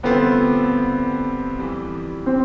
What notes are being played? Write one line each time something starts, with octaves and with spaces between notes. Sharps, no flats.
G2 D3 A3 B3 C4 F4
F2 E3 G3
C4